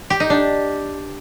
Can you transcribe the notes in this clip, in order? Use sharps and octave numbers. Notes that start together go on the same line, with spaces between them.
G4
D#4
D4